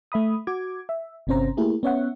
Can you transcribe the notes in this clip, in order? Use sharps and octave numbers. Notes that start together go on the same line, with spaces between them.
A3 E5 B5 D#6
F#4 D6 G#6
E5
G1 C3 C4 C#4 C5 A#5
A3 A#3 E4 G4 G#4 A#4
B3 C#4 C#5 E5 F#5